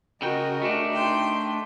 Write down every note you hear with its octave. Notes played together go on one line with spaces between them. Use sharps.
C#3 F#4 A#4 D#5 G5
A3 D4
D#4 G5 C6